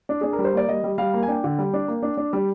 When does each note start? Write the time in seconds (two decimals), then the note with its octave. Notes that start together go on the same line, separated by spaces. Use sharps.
0.09 D4
0.21 D4 G#4
0.33 A#4
0.39 G3
0.45 C5
0.53 A#3 D5
0.68 G3 D#5
0.84 G3
0.98 G3 F5
1.14 A#3
1.23 G#5
1.28 D4 G5
1.44 D3
1.59 G3
1.73 D4
1.88 A#3
2.02 D4
2.17 D4
2.33 G3